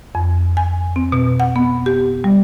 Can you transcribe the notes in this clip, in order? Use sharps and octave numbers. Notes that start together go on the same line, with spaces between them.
F2
G#5
C4
B2
F#5
B3
G4
G3